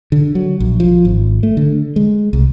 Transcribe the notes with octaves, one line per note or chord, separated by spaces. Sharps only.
D3
F#3
A#1
F3
G#1
A3
D3
G#3
C2